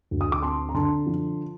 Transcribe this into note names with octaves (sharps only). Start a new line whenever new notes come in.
D2
D#6
D6
C4 A5 C6
A#5
D3 A5 C6
F3